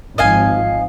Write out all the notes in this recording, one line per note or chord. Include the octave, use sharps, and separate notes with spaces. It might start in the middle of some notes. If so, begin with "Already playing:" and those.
G#1 F3 D#5 F5 G#5